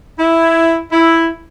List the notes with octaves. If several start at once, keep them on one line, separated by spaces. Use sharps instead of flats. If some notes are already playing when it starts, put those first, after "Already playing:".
E4
E4